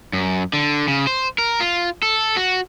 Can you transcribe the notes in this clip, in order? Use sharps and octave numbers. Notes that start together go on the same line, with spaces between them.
F#2
D3
C#3
C5
A#4
F4
A4
F#4